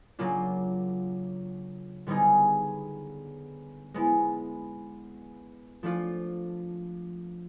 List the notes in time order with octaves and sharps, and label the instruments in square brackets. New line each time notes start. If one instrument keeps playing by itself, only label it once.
[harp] C#3 F#3 A#3 D4 F4
D3 G3 B3 D#4 G#4
G#3 B3 E4
F3 A3 D4 F4